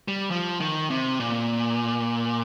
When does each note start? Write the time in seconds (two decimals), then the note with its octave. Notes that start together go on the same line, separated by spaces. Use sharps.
0.08 G3
0.31 F3
0.60 D#3
0.90 C3
1.20 A#2